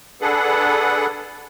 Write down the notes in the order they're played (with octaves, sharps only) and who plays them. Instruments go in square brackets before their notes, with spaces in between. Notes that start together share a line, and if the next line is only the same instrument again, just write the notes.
[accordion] D4 G#4 A4 B4 F#5